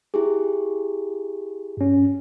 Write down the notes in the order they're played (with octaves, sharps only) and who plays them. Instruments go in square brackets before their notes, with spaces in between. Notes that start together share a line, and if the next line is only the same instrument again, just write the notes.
[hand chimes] E4 G4 G#4
[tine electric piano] G2 C#4